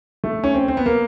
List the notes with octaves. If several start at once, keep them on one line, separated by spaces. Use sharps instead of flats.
A3
C#4
C4
C4
B3
A#3